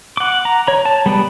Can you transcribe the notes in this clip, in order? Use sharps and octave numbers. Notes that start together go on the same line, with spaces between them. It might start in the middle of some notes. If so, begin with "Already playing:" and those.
F#5 D6
A#5
C#5 A#5
A5
G3 B3 G#4 B4 D5